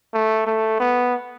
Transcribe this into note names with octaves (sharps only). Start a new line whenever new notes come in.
A3
A3
B3